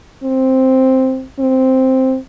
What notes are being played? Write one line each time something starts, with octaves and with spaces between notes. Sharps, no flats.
C4
C4